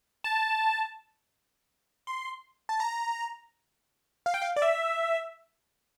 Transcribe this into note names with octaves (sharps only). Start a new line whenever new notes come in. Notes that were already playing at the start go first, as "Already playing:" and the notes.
A5
C6
A5
A#5
F5
G5
F5
D5
E5